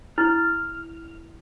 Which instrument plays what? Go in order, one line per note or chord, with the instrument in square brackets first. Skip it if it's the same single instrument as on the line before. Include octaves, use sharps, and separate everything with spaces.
[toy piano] E4 [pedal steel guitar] F6